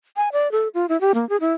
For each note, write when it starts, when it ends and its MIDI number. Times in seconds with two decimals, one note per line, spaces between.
0.16 0.29 80
0.32 0.51 74
0.52 0.68 69
0.74 0.86 65
0.89 0.99 64
1.01 1.12 67
1.14 1.27 58
1.29 1.37 68
1.41 1.53 64